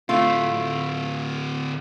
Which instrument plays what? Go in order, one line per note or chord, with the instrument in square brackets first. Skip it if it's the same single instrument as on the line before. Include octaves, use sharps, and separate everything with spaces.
[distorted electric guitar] D2 A2 [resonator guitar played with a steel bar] A3 F4